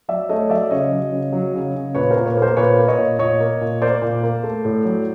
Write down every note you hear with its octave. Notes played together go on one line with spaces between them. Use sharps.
F#3 D5 E5
A3 C#5 D#5
F#3 D5 E5
C#3 C#5 D#5
F#3
C#3
F#3
C#3
C#3
A#2 B4 C#5
A#4 C5
A#2
B4 C#5
A#3 A#4 C5
A#2 B4 C#5
A#3
C#5 D#5
A#2
A#2 C#5 D#5
A#3
A#2
A#3 C5 D5
A#2
A#3
A3
A2
F#3